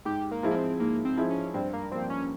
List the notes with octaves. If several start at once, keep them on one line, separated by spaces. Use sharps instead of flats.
G#2 G4
A#3
F3 G#3 E4 G#4
A#3
C4
G#2 A#3
C4
F3 G#3 E4 G#4
C#4
G2 C4
A#3
F3 A#3 C4
C#4